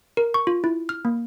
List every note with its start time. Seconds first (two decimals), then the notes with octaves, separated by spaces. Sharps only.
0.17 A#4
0.34 C#6
0.47 F4
0.64 E4
0.89 F6
1.05 A#3